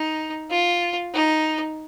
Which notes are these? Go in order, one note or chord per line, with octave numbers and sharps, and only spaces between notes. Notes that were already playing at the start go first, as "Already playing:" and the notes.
Already playing: D#4
F4
D#4